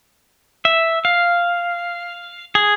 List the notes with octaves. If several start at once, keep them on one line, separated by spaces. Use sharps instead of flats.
E5
F5
G#4